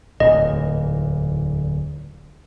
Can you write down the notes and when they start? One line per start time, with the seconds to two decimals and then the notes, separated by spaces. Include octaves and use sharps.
0.20 D1 E2 A#2 D#5